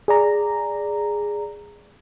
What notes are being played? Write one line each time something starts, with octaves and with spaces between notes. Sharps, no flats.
G#4 D5 A#5